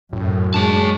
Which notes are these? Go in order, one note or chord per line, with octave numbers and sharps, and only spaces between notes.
F#2 A2
G#3 D4 C#5 A5